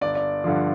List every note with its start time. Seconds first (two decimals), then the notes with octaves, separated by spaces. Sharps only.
0.01 G1 D5
0.15 D5
0.44 G2 D3 F3